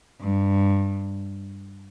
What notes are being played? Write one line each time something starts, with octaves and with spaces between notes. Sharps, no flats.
G2